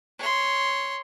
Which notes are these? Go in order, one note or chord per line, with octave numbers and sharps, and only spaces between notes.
C#5 C6